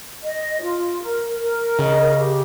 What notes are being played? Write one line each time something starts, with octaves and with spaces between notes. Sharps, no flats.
D#5
F4
A#4
A#4
C#3 D#5
G4